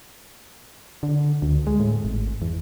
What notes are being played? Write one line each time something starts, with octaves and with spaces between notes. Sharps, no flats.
D3
D2
G#3
A2
G#1
E2